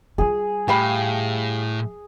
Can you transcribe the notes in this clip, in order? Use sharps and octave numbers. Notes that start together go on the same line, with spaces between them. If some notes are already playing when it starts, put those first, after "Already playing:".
G3 F4 G#4
A2 G4 F5 B5